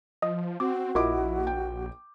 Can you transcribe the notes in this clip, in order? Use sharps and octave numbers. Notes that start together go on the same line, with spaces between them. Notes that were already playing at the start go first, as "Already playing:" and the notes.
F3 D#5 D#6
C4 F#4 D6
A#1 E4 F4 A#4 D#5 D6
G5